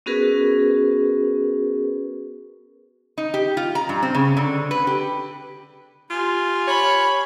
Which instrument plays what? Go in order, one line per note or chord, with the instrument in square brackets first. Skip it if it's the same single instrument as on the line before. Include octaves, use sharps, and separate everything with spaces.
[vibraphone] B3 C#4 F#4 G#4 A#4 B4
[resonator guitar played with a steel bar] D#4
G4
F4
A#5
G2
C4
C#3
D3
B4
G4
[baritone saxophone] F4 [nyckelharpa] G4 G#5
[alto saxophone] C#5 [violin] B5